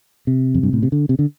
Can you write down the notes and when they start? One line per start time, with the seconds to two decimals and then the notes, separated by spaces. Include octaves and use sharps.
0.27 C3
0.54 F2
0.63 G2
0.73 A2
0.83 C3
0.92 D3
1.09 C3
1.19 D3